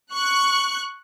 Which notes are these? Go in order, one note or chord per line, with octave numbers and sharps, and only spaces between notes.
C#6 F#6